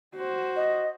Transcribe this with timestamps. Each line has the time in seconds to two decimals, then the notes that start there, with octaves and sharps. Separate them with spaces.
0.15 F#4 C5
0.56 D#5